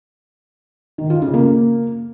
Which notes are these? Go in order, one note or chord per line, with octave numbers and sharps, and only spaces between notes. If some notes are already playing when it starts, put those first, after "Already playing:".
D#3
F4
C#3
A#3